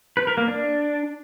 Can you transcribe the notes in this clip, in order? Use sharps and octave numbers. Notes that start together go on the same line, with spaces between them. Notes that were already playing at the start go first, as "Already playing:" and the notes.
B4
A#4
A#3
D4